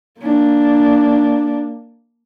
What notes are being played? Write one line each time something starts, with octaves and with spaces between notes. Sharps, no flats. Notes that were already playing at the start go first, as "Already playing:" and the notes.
A#3 D4